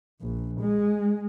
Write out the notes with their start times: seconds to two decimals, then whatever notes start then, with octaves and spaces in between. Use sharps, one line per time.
0.21 A#1
0.61 G#3